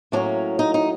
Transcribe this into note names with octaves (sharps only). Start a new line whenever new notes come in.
A2 F#3 A#3 C#4 D4
D#4
D#4